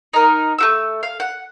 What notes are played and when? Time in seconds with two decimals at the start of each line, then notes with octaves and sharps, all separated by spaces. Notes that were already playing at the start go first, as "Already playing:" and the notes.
0.13 D#4 A#4
0.58 A3 F#4 E6
1.03 F5
1.20 F#5